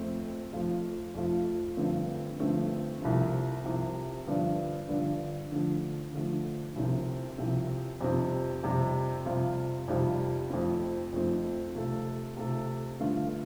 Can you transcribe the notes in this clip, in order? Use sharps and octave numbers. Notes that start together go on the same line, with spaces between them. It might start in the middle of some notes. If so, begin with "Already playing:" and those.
Already playing: F2 F3 A3 C4
F2 F3 A3 F4
F2 F3 A3 F4
G2 D3 F3 A3 C4
G2 D3 F3 A3 C4
C2 C3 F3
C2 C3 F3
G2 D3 F3 D4
G2 D3 F3 D4
D3 F3 A3
D3 F3 A3
C2 C3 F3 C4
C2 C3 F3 C4
F2 C3 G3 C4
F2 C3 G3 C4
F2 C3 G3 F4
F2 C3 G3 F4
F2 F3 A3 C4
F2 F3 A3 C4
C3 A3 F4 A4
C3 A3 F4 A4
G2 D3 A3 F4